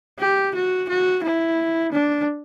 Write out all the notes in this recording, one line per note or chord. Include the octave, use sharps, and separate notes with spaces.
G4
F#4
F#4
E4
D4